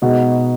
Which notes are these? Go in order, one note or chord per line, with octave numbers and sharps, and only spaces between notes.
B2 G#3 D#4 F#4